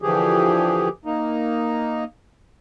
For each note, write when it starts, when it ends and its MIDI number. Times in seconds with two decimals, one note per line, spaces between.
0.02 0.89 50
0.02 0.89 52
0.02 0.89 53
0.02 0.89 67
0.02 0.89 68
1.05 2.04 58
1.05 2.04 63